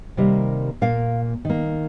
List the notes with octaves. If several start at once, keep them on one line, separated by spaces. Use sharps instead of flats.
C3 D#3 G3 A#3
A#2 A#3 F5
D#3 A#3